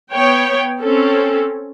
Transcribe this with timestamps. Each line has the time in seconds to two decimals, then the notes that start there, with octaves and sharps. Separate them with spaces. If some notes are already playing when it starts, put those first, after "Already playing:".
0.12 B3 C#5 G5
0.80 C4 C#4 A4